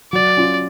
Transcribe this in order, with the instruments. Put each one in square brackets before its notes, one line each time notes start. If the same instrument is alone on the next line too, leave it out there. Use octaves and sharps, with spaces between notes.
[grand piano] F#3 [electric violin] D5
[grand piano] C#4 F4